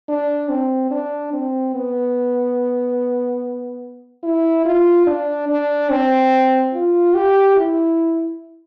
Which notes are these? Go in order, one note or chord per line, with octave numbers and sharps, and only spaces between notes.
D4
C4
D4
C4
B3
E4
F4
D4
D4
C4
F4
G4
E4